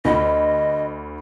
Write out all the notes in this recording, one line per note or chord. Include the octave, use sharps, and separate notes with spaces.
D2 D#5 B5